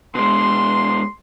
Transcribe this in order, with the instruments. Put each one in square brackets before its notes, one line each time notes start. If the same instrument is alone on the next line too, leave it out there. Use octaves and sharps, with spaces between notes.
[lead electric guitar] B2 G#3 [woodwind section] C6